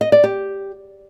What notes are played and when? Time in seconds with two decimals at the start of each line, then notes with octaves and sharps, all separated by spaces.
0.01 D#5
0.12 D5
0.24 G4